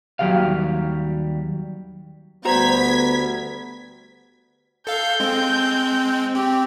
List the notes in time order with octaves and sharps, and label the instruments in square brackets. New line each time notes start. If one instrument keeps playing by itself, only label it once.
[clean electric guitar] D#2 F#3 G3 G4 F5
[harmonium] D2 G3 [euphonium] B3 [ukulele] F#4 C5 A#5 [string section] G#6 B6
[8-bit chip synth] A4 F5 [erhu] G6
[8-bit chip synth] G#3 C4
[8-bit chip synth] C4 [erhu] G4